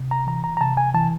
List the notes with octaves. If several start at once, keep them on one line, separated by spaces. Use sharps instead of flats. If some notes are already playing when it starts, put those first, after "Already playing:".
Already playing: C3
A#5
E3 A#5
A#5
A#5
C3 A5
G#5
E3 A5